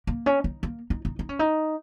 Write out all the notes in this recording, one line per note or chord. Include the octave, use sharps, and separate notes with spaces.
A#3
C#4
D#4
A#3
D#4
D#4
D#4
C#4
D#4